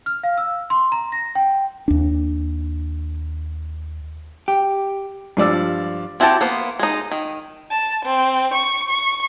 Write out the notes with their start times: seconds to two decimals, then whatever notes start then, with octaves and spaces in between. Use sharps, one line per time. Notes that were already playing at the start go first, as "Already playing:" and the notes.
0.06 F6
0.23 F5
0.38 E6
0.70 C6
0.92 A#5
1.12 A#6
1.35 G5
1.88 D#2 D4
4.48 G4
5.37 G2 F3 D5 E6
6.20 C4 E4 F#4 G4 A5
6.41 A#3 B3 C5
6.79 G#3 D#4
7.11 D#3
7.71 A5
8.05 C4
8.54 C#6
8.89 C#6